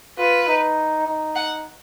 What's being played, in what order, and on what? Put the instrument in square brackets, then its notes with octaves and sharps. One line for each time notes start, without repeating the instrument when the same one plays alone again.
[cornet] F4 [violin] B4
[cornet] D#4
D#4
[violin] F#5